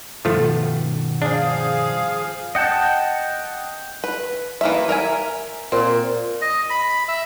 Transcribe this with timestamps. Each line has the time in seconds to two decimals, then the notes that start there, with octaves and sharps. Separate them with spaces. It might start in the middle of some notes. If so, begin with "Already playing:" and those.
0.25 G2 B2 D#3 F3 A3 F4
1.22 F3 D4 G#4 F5
2.55 D#5 F#5 G5 A5
4.04 B4
4.61 E3 A#3 E5
4.89 A#4 E5 G#5
5.72 A#2 C4
6.42 D#5
6.70 B5
7.08 E5